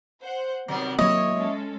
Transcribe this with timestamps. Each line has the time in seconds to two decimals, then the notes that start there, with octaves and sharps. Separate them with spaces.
0.22 C5 F#5
0.68 C3 D#3 F#3 G3 B3
0.99 F#3 A#3 E4 C#5 D#5
1.36 G#3 C#4 A4